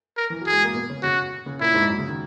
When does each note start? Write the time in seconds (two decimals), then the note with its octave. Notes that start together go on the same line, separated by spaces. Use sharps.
0.17 A#4
0.30 E3
0.41 F#3
0.47 G#4
0.52 G#3
0.64 A#3
0.74 B2 B3
0.90 C#3 C#4
1.03 C#3 C#4 F#4
1.46 C#3 C#4
1.60 A#2 A#3 E4
1.74 G#2 G#3
1.88 F#2 F#3
1.98 C#3
2.08 D#3